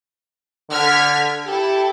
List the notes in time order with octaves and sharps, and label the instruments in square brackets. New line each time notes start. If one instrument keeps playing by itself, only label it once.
[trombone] D3 [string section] F6 G#6 B6
[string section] E4 A4 [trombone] G4